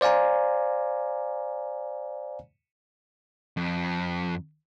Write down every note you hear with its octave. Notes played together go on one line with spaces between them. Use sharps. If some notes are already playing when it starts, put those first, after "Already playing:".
C5 D5 F5 G#5 A#5
F2